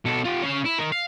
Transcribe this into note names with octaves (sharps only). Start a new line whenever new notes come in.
B2 A4
F4 G4
C#4 F5
E4
D#4 A#4
F5